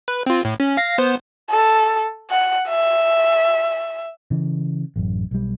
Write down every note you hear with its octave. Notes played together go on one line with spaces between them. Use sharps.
B4
C4 F4
A2
C#4
F5 A#6 C7
B3 C5
A4
F#5
E5
C#3 E3
A1 F#2
B1 G3